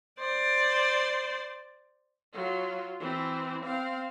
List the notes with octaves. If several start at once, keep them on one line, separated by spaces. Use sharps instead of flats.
C5 D5
F#3 F4
E3 C4
C4 F5